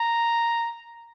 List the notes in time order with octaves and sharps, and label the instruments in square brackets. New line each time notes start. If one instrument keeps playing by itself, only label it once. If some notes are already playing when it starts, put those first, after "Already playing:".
Already playing: [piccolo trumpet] A#5